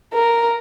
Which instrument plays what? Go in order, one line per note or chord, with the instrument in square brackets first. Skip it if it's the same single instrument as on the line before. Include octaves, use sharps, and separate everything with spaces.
[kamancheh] A#4